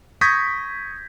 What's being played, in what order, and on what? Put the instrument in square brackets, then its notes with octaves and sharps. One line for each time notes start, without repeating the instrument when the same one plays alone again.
[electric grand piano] C#6 D#6 G6 G#6 A#6 B6